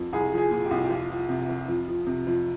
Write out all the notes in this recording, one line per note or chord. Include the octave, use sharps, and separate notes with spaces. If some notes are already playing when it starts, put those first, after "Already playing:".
Already playing: F2
C2 G#4
F3
G#4
A#2
G4
C2
G4
F2 F4
F3
C3
F2
F2
F3
C3
F2